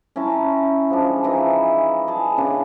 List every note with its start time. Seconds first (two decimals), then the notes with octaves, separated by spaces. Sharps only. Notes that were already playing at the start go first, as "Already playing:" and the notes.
0.16 C#4 E4 A5 A#5
0.90 F3 G#3 D4
1.24 E3 F3 D#4 E4
2.08 G#4 A5
2.37 C#3 B3 D4